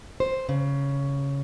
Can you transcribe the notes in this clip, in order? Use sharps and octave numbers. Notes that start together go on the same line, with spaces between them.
C5
C#3